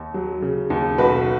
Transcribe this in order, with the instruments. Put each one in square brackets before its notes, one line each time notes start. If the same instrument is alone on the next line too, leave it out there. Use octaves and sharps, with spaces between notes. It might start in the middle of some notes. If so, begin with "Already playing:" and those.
Already playing: [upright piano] D#2
F#3
C#3
D#2
B1 F#4 B4